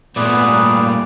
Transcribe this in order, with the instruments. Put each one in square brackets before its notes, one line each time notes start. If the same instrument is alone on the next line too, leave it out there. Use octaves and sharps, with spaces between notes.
[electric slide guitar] A#2 A3 [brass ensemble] B3 [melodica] G#4 B4 [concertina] D5
[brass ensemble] C#3 G3 A#3